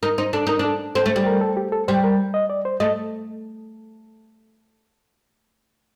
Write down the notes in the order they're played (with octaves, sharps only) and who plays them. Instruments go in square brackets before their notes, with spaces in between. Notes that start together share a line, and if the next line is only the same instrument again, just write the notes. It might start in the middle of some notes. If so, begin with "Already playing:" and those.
[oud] D#4 [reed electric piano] A#4
[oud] D#4 [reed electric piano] C5
[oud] D4 [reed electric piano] A4
[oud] D#4 [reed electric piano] A#4
[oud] D4
[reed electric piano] A4
[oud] C4 [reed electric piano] A4
[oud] A3
G3
[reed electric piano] A#4
A4
G4
A4
[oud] G3 [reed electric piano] C5
[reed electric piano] A#4
D#5
D5
C5
[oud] A3 [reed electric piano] D#5